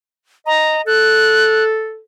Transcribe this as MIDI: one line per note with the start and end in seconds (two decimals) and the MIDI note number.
0.46 0.80 75
0.46 0.81 82
0.87 2.00 69
0.87 1.64 90